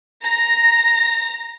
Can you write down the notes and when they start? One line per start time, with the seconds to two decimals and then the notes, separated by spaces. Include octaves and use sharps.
0.22 A#5 A#6